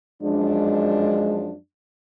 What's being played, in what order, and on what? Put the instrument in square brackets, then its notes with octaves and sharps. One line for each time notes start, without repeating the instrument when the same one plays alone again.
[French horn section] F#2 F3 D4 [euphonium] G#3